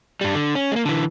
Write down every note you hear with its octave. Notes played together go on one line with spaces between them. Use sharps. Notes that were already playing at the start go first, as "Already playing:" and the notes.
G2 G3
D3
C#4
G#3 A#3
D3 E3